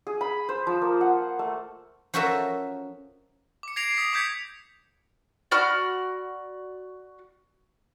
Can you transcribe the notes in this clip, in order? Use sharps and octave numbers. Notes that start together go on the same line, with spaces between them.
G#4
B5
C5
F3
A#3
F#5
A3
F3 C#4 F#4 A4 A#4 E5
D6 C#7
G#6 A#6 C7 D7 F7
D#6 B6
D6 D#6 G6 G#6 B6 C#7
F#4 D5 B5 F6